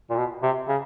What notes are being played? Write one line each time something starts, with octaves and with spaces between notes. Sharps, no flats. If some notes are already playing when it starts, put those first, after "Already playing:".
A#2
B2
C3
C#3